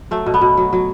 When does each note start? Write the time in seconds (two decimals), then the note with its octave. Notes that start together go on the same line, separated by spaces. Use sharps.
0.11 F#3 A3
0.26 B2
0.34 B3
0.41 B2
0.57 F#3
0.73 F#3